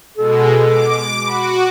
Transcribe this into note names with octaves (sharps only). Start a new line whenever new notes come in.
B2 G#3 A4
D6
F#4 B5